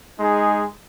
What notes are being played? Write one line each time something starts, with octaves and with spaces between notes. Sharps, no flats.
G#3 D#4 G#4